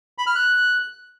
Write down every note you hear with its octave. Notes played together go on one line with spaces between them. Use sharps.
B5
F6
F#6